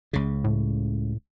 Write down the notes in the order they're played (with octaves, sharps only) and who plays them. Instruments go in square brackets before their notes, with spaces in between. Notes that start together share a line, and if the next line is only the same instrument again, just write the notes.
[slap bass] C#2 C#3
[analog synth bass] A2